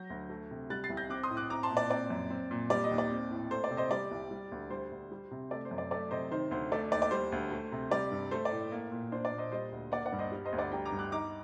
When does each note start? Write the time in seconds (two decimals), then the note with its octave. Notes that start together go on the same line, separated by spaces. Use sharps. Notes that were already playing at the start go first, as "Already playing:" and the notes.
Already playing: F#3 G6 A#6
0.10 D2
0.30 A3
0.51 C3
0.70 G3 F#6 A6
0.84 A6 C7
0.90 C2
0.97 G6 A#6
1.10 C4 D6 F#6
1.23 C6 D#6
1.30 A2
1.37 D6 F#6
1.50 C4 A#5 D6
1.63 A5 C6
1.70 A#2
1.77 D5
1.90 C4 D5
2.10 F#2
2.30 C4
2.51 A#2
2.70 G3 D5
2.84 D#5
2.91 D#2
2.98 D5
3.10 C4
3.31 A2
3.51 A3 C5
3.64 D5
3.71 C3
3.77 C5 D#5
3.91 G3 D5
4.11 C2
4.31 G3
4.51 D2
4.70 G3 C5
4.92 D2
5.12 G3
5.31 C3
5.51 A3 D5
5.65 C5
5.71 F#2
5.78 D5
5.91 A3 D5
6.11 C3 C5 D#5
6.31 D#3 C5
6.51 D2 C5
6.72 A3 D5
6.91 D#2 D5
7.02 D5
7.11 G3 C5
7.32 D2
7.52 A3
7.72 C3
7.91 G3 D5
8.12 G2
8.31 A3 C5
8.45 D5
8.52 A2
8.72 A#3
8.91 A#2
9.12 D4 C5
9.25 D5
9.32 A#2
9.38 C5 D#5
9.52 G3 C5 D#5
9.72 D2
9.92 A#3 D5 F#5
10.06 D5 F#5
10.12 G2
10.19 C5 D#5
10.32 G3
10.46 C5 D#5
10.52 D2
10.59 D5 F#5
10.72 G3 G5 A#5
10.86 A#5 D6
10.92 G2
10.99 D6 F#6
11.12 D#4 A#5 D6